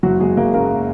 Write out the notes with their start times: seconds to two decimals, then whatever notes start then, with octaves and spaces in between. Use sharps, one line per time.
0.03 F#1 F#3 F#4
0.20 F#3 G#3 G#4
0.37 F#2 A#3 A#4
0.53 C#3 A#3 A#4